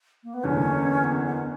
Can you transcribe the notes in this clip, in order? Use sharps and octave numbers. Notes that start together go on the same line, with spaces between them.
A#3
B3
F#1 E2 D3 C#4
B3
B3